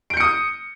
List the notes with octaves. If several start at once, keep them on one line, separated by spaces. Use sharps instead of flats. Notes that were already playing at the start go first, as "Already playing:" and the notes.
D#6 G6 C#7 D7